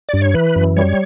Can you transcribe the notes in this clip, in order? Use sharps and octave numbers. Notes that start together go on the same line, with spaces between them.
G2 D5
C#5
E3 B4
F#2
G3 C#5